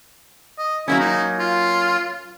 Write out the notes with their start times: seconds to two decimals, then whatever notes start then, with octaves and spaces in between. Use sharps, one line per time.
0.58 D#5
0.88 F#3 A#3 C#4 E4
0.99 D#4
1.39 F4